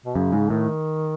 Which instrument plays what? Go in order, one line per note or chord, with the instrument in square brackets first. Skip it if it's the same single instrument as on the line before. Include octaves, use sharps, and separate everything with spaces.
[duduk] B2
[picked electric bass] F#2 [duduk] C#3
[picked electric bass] G#2
[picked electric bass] A2 [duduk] D#3